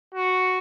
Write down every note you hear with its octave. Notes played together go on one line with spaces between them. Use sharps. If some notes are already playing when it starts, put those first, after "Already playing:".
F#4